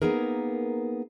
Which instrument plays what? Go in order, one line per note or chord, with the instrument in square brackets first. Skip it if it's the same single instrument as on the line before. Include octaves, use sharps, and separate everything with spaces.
[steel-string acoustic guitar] A#3 B3 D#4 G#4 A#4